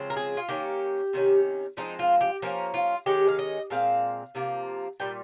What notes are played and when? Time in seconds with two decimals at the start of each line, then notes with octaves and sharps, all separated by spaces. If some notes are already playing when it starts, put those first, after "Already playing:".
Already playing: C#3 F3 G#3 C4
0.10 A#4
0.16 G#4
0.37 F4
0.48 D#3 A#3 C#4 G4
1.13 C3 D#3 A#3 C#4
1.77 F3 G#3 C4 D#4
1.99 F4
2.21 G4
2.42 F3 A#3 C#4 A#4
2.74 F4
3.06 D#3 G#3 C#4 G4
3.29 F5
3.39 D#5
3.70 A#2 G#3 C4 F5
4.35 C3 F3 A#3
5.00 A#2 G3 G5